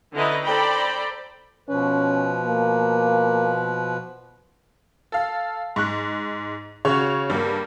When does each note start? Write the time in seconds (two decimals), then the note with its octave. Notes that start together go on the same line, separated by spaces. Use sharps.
0.14 D3 C#4 E4 B4 D#5 A#5
0.46 A4 C5 D5 G5 A#5 B5
1.69 B2 F3 C#4 B4
2.46 A#3
5.12 A4 F5
5.76 G#2 C#6 F#6
6.85 C#3 F#4 C#5
7.30 G2 G3 A#3